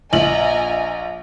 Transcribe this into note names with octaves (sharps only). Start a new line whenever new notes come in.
A#1 D#5 G#5 A#5 F#7